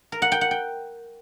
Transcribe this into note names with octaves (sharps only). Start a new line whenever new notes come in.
A#4
F#5
G5
F#5
G5